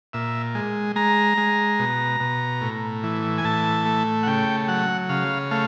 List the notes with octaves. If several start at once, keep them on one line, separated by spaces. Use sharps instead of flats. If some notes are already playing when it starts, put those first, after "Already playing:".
A#2 E5
G#3
G#3 A#5
G#3
B2
B2
A2
E3
G#5
A2 A5
A3
F#5
C#3 G5
F#3 F#5
C#3 F5
A3 F5